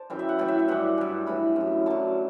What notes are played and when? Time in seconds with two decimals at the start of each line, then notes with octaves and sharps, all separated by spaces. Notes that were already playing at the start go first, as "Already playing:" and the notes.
Already playing: C5 D5 A5
0.10 F#2 E3 G5
0.19 E5
0.29 F#5
0.39 A2 E3 G5
0.48 E5
0.59 E5
0.68 G2 E3 F#5
0.98 G2 E3
1.26 A2 E3 B5
1.56 F#2 E3
1.86 F#2 D3 F#3 A5